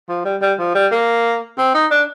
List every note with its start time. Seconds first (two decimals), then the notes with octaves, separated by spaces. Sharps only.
0.09 F3
0.25 G3
0.41 G3
0.59 F3
0.75 G3
0.92 A#3
1.58 C4
1.74 D#4
1.91 D4